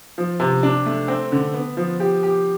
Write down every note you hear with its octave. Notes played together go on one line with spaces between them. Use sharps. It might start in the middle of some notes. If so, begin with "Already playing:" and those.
F3
C3
D4
A3
C4
D3
B3
F3
G4
G4